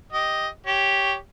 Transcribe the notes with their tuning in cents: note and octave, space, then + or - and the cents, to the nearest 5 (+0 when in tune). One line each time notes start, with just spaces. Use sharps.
G4 +0 D#5 +5
G4 +0 C#5 +5